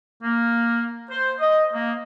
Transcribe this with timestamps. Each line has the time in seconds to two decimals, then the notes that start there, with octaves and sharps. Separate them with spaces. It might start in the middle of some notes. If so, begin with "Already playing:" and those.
0.23 A#3
1.11 C5
1.40 D#5
1.74 A#3